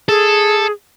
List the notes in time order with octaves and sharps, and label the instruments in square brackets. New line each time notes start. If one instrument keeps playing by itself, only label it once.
[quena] G#4 [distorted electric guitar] A4